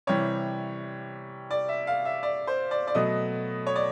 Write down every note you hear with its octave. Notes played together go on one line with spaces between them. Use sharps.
C3 E3 G3 C#5
D5
E5
F5
E5
D5
C5
D5
D5
B2 F#3 A3 D#5
C#5
D5